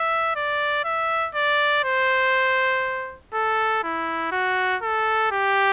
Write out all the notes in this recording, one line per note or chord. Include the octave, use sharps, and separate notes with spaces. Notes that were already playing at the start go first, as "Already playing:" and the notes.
Already playing: E5
D5
E5
D5
C5
A4
E4
F#4
A4
G4